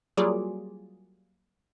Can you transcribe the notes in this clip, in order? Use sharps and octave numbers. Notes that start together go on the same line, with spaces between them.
F#3 G3 A#3 F4 G#4 D5